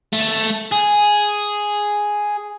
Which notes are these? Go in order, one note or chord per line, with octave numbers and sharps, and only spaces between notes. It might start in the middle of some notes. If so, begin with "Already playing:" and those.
A3
G#4